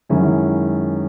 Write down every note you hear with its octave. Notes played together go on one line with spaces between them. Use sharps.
F#2 D#3 G#3 C#4 E4